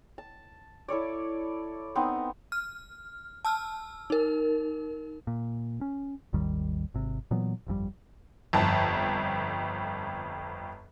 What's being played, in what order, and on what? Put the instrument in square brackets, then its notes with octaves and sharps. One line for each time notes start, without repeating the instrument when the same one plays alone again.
[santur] A5
E4 A4 C#5 D5
B3 C4 D#4
[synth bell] F6
A5 E6 F6
D#4 A#4
[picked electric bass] A#2
C#4
G#1 D#2 D#3 G3
G#1 C3
A#2 E3 F#3 B3
G1 F2 B2 G3
[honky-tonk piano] G1 F2 A5